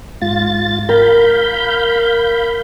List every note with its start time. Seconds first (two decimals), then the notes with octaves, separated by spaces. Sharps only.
0.22 G#2 F4 A6
0.89 A#4 F5 B5 G6